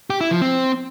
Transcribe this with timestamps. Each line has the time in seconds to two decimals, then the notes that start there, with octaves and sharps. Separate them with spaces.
0.10 G4
0.21 E4
0.31 F3
0.41 C4